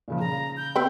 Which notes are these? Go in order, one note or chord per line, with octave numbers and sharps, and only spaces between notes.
A#2 C#3 F3
C#3 A#5
G6
C4 B4 G5